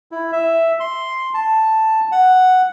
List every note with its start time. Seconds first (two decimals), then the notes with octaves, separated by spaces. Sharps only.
0.12 E4
0.32 E5
0.80 C6
1.34 A5
2.12 F#5